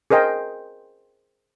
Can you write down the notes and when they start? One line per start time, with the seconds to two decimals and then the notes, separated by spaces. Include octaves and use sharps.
0.11 G#4 A#4 C5 D#5 G5